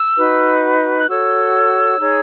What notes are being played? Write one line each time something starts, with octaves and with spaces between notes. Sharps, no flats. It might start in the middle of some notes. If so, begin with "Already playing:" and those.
Already playing: E6
D#4 F#4 B4
F#6
F#4 A4 C#5 E6
D#4 G#4 C#5